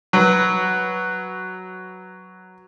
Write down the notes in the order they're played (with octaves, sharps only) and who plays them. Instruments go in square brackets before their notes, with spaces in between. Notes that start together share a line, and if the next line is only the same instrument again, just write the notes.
[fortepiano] F#3 B4